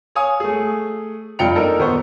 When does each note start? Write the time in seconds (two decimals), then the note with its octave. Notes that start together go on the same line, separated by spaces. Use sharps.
0.15 C#5 F5 G#5 D#6
0.40 A3 G#4
1.39 F1 G2 F4 G5 C#7 F7
1.55 A#3 D4 D#4 A4 A#4
1.79 D#1 B3 C5 C#6